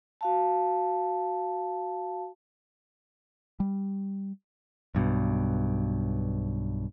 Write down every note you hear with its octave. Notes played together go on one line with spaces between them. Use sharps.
F#4 F5 A5
G3
B1 G2 B2